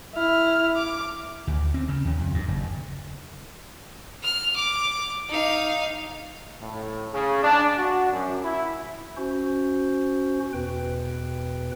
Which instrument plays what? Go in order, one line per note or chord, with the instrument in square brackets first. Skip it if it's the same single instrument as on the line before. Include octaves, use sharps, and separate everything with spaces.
[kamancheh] E4 F6
D6
[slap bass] D2
C4
C#3
D#2
F2
G2
F#1
[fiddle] F6
D6
D#4 F5
[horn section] A2
C#3
D4
F#4
F#2
E4
[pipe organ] C#4 F#4 C5
E2 B2 B4 G5